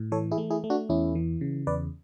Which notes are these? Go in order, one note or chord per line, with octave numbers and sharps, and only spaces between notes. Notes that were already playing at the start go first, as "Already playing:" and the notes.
Already playing: A2
E3 A4 C#5
E4 G#4
A3
E4 G#4
A3
D4 F#4
E2 C#4 E4
E3
C#3
E2 B4 D5